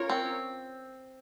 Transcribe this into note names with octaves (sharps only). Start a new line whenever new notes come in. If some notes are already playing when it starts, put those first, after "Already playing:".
Already playing: C#4 F4 A#4 C#5
C4